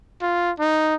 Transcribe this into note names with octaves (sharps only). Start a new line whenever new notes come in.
F4
D#4